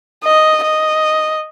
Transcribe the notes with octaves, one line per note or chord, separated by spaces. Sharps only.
D#5
D#5